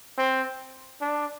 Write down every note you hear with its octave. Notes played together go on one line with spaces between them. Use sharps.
C4
D4